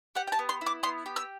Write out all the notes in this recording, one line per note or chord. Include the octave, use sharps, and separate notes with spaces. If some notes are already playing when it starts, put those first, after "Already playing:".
G4 F#5
G5
A5
B3
C6
E4
D6
B3 C6
G4
E6